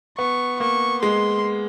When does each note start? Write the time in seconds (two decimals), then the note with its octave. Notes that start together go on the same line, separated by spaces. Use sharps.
0.18 B3 C#6
0.60 A#3 C#6
1.03 G#3 C6